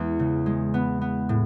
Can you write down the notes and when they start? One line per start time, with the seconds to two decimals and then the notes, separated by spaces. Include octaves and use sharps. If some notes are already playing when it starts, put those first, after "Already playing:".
Already playing: E2 G#3 B3
0.19 C#3
0.46 G#3
0.74 B3
1.01 B3
1.29 A2